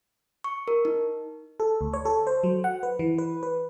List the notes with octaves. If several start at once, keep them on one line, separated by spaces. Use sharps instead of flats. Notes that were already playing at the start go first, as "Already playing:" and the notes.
C#6
A#4
D#4
A4
D2
C#5
A4
C5
F#3
F#5
B4
E3
B4
B4